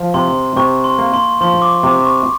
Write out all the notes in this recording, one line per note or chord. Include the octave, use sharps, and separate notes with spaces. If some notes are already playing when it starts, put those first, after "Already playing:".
Already playing: F3
C3 C6
C3 C#6
C6
A#3
C6
F3 C6
D6
C3 D6
C#6